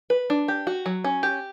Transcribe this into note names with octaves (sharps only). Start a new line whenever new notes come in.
B4
D4
G4
F#4
F#3
C#4
G4